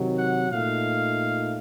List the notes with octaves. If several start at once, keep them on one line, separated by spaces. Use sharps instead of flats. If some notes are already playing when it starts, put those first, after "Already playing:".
Already playing: C3 D#3 F#3
F#5
A#2 A3 D#4 F5